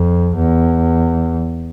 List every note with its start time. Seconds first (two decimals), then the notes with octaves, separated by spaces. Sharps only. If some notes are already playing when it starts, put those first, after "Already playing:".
Already playing: F2
0.36 E2